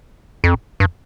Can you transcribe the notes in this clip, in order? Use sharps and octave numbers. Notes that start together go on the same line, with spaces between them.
F2
G2